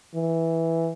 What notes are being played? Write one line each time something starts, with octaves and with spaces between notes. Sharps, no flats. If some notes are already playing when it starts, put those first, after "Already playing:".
E3